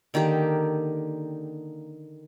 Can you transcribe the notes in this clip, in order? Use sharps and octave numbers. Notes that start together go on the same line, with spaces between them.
D3 D#3 A#3 G4